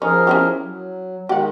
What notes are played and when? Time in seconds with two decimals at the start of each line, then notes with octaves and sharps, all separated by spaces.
0.02 F3 C#4 D#4 G#4 A#4
0.27 C#4 E4 G4
0.64 F#3
1.29 D#3 G#3 G4 F#5